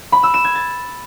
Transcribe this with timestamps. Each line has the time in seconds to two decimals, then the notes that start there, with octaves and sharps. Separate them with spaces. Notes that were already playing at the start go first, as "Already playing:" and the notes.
0.12 B5
0.23 E6
0.34 E7
0.45 G#6
0.55 A6